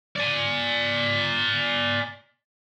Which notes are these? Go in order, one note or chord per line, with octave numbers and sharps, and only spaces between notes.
D5 G#5